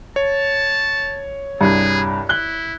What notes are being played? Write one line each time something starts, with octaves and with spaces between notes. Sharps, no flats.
C#5 A5
C2 G2 G#4
E4 F#6 G7